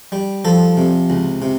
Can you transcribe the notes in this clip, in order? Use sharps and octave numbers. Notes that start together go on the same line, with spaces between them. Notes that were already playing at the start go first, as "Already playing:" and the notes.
G3
F3 A4
C3
C#2
C3